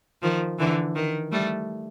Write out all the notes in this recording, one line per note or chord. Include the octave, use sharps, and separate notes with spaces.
D#3 F3
D3 E3
D#3
G3 A3